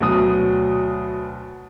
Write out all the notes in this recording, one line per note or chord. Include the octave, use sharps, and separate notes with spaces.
D2 B2 F#3 D#6